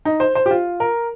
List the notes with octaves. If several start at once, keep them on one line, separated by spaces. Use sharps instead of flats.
D#4
C5
C5
G4
F4
A#4